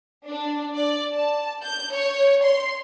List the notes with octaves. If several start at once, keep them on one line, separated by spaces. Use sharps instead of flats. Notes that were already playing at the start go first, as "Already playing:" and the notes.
D4
D5
A5
G6
C#5
C6